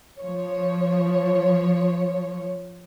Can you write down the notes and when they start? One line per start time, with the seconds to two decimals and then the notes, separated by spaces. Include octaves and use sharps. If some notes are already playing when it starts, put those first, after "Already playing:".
0.20 F3 C#5